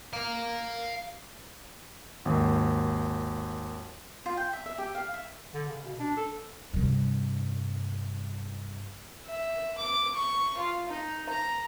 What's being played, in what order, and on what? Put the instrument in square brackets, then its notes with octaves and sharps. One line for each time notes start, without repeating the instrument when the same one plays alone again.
[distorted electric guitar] F5 A#5
[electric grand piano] G#1 D#2
[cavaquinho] F4
G5
E5
E5
G4
F5
E5
[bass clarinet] D3
C#3
B2
D4
A4
[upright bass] G2 C3
[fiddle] E5
D6
C#6
F4
D#4
A#5